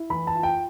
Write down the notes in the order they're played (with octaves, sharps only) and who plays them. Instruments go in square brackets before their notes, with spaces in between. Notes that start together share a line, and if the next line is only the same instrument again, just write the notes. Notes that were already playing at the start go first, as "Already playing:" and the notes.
Already playing: [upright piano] E4
E3 B5
A5
F4
G5